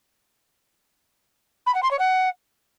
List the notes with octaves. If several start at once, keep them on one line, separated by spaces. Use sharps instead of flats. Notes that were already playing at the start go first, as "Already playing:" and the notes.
B5
F#5
C6
C#5
F#5